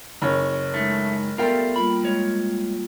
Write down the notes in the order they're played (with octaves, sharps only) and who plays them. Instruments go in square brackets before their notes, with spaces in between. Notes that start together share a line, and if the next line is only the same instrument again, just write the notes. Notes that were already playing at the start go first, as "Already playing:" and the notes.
[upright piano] F#1 C#5
[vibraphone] G#3 D#4 [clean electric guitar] A3
[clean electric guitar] G3 A3 F4 [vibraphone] B3 A4 E5 [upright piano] A#4 G5
[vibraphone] G3 A#3 F4 [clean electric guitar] B5
[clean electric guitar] G#3 C#5